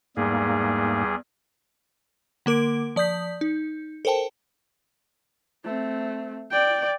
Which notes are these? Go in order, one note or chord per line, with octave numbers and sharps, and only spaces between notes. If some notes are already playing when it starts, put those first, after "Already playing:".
E2 G#2 G3 A#3 G#4
D3 A#3 A#4 D6 D7
F3 D5 D#6 G6 B6
D#4
A4 A#4 C5 G5 A5
A3 C4
D5 G5